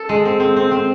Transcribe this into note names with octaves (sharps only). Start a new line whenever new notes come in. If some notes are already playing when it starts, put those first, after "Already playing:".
Already playing: A4
G#3
C4
C4
C4
C4